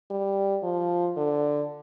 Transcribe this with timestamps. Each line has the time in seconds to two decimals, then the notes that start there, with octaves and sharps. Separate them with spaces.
0.10 G3
0.63 F3
1.17 D3